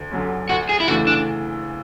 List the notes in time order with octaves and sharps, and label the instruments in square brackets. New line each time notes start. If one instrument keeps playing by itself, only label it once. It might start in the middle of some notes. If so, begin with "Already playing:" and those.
Already playing: [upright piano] D2
D3 F#3 C#4
[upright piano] D2 [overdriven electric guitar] F#4
[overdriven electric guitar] G#4
E4
[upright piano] C#3 E3 A3 D4 [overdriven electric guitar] F#4
[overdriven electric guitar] D4